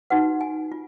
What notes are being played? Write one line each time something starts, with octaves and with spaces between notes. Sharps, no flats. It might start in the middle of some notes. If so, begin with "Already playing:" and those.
D#4 F#4 B4 F#5
G#5
F4